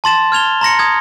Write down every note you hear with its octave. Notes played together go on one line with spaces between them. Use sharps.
A5 C6 A6 E7
F6 G#6 F7 G7
A#5 C6 A#6 C#7
D#6 G#6